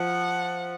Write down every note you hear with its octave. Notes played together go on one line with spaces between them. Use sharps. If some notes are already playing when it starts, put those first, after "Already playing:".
Already playing: F3 F#5